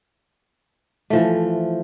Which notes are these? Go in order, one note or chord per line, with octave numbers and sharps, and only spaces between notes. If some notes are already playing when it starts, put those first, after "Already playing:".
E3 F3 A3